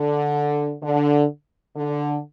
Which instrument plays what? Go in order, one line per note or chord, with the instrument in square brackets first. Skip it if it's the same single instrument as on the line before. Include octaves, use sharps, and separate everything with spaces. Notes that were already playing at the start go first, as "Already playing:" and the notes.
Already playing: [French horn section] D3
D3
D3